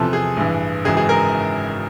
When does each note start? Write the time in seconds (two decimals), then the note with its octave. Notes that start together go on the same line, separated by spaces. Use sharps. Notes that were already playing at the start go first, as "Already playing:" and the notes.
Already playing: E2 C3 F3 A4
0.13 G#4
0.37 A1 G2 E3
0.85 G#1 F#2 C#3 E3 G#4
0.97 G#4
1.09 A#4